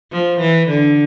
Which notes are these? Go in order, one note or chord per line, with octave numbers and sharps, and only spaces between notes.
F3
E3
D3